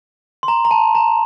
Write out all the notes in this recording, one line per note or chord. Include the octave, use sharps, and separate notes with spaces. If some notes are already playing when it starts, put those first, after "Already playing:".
C6
A#5
A#5
A5
A#5